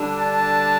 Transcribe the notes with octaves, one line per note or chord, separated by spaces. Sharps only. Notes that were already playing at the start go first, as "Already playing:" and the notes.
Already playing: D3 G3 D4
A5